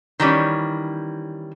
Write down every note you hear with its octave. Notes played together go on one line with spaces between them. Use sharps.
D#3 E3 G3 C#4